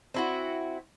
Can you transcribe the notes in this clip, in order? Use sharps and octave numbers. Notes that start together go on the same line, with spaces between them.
C4 E4 F#4